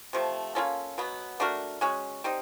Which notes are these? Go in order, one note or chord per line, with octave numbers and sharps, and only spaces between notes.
C3 F3 A3
A#3 C#4 F4 A4
B2 F#3 B3
A3 D4 F#4 A#4
G#3 C#4 F#4
G3 C4 D#4